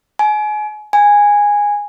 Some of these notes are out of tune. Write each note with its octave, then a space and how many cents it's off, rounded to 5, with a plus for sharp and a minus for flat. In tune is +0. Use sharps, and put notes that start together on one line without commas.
G#5 +30
G#5 -10